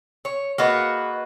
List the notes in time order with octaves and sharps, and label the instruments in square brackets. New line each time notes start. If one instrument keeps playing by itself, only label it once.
[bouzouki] C#5
[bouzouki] A#3 F#4 B4 [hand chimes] G#4 D#5